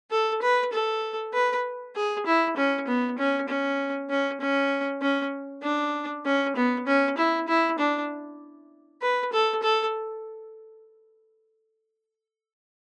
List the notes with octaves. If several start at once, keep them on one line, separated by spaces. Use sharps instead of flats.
A4
B4
A4
B4
G#4
E4
C#4
B3
C#4
C#4
C#4
C#4
C#4
D4
C#4
B3
C#4
E4
E4
D4
B4
A4
A4